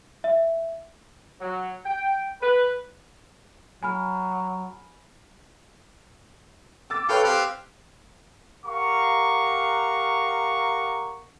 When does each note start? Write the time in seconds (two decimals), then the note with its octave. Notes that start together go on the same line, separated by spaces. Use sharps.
0.24 E5
1.41 F#3
1.85 G5
2.42 B4
3.83 F#3 G#5 B5 F6
6.90 D6 E6 A6
7.09 A4 B4 C#5 F5 G5
7.24 C4 G4 F5 F#6
8.65 G4 A#4 F5 F#5 A#5 C#6